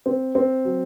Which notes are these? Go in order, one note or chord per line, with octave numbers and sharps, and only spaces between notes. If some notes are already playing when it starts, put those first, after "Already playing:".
C4
C4
F#3